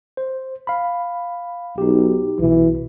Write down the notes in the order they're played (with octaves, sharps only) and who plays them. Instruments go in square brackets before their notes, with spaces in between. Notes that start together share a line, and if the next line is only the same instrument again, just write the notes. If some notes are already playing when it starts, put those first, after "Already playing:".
[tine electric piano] C5
F5 B5
[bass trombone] B1 [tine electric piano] D#4 G4
[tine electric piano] B1 B2 [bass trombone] E3